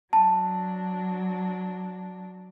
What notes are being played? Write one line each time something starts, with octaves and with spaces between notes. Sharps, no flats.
F#3 D4 A5